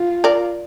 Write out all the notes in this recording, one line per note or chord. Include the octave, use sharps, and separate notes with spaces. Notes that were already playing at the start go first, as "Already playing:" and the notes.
Already playing: F4
A#4 D5